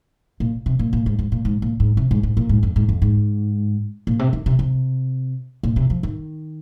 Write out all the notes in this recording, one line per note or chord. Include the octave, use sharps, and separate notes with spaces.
A#2
C3
A#2
A#2
G#2
G#2
A#2
G#2
A#2
G#2
C3
G#2
G#2
A#2
G#2
F2
G#2
F2
G#2
A#2
C3
D#3
C3
C3
A#2
C3
F3
D#3